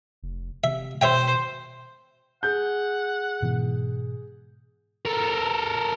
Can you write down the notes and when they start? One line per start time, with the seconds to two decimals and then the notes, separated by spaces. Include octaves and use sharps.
0.23 F1
0.64 C3 E5
1.01 B2 C5 C#5 E5 G5
2.43 G#4 F#5 G6
3.42 G#2 B2 E3
5.05 A4 A#4